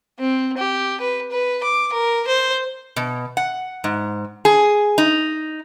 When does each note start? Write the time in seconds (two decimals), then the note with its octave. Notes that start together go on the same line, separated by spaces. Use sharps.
0.19 C4
0.58 G4
1.01 B4
1.31 B4
1.63 D6
1.93 A#4
2.27 C5
2.96 B2
3.37 F#5
3.84 G#2
4.45 G#4
4.98 D#4